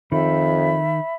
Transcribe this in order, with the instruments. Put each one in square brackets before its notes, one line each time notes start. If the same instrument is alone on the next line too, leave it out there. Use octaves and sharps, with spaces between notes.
[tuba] F2 [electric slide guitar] D#3 [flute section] E5 B5